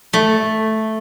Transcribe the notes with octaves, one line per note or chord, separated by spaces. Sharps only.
A3